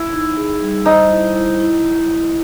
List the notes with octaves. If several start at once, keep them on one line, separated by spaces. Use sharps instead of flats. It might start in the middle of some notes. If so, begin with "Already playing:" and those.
Already playing: E4
D#4
G#4
G3
D#4 C5
E4
E4
E4